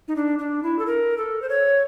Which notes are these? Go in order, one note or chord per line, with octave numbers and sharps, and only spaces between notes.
D#4
D4
D4
E4
A4
A#4
A4
C5
C#5